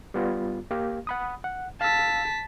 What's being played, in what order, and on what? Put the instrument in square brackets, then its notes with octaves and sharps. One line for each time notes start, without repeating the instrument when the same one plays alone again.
[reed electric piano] G3 B3 F4
A#3 G4 F5
F#5 B5 D#6
F#5
[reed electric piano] F5 E6 [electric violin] A5 B6